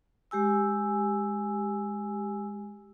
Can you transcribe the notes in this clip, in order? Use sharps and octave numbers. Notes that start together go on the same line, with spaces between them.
G#3 G4 G#5 E6